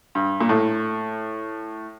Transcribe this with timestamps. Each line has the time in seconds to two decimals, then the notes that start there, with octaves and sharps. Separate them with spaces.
0.15 G2
0.40 A#2
0.49 A2